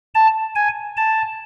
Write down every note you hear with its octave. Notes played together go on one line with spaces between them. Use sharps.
A5
G#5
A5